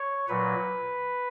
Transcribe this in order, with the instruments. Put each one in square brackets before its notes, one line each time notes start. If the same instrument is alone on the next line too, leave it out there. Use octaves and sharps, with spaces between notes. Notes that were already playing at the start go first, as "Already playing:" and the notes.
Already playing: [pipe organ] C#5
A#2 F#3 B4